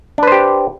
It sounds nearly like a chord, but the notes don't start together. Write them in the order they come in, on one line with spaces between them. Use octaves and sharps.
D4 B4 C5 G4